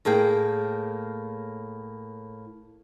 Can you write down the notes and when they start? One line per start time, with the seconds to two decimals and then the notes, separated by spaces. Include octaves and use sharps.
0.05 A2 A#3 G#4 G5